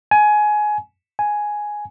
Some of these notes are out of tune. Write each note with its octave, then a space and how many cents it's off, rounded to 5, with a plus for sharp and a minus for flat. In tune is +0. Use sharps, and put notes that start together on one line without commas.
G#5 +20
G#5 +5